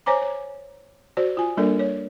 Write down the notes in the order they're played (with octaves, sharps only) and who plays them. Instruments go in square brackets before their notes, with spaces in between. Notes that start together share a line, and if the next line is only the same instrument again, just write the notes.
[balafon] C5 C#5 G#5 A#5 D6
C#5
F#4 C5 D5
F4 G#5
G3 A#3 D4 A4 A#4 D5
C#5